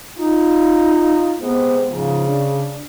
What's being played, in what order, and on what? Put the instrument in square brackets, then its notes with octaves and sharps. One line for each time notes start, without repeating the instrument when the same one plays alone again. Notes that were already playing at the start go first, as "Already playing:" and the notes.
[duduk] D#4 [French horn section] F4
[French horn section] C3 G#3 C5 [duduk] B3
[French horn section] G#2 F3 [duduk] C#3
[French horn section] D4